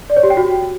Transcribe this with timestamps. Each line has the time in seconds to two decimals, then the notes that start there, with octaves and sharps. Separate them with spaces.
0.10 D5
0.17 C#5
0.23 G4
0.30 G5
0.37 F#4